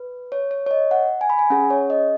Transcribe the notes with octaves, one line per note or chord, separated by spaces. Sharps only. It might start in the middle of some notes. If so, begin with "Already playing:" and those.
Already playing: B4
C#5
C#5
C#5
D#5
F#5
G#5
B5
G#5
C#4 G#4 F#5
C#5
D#5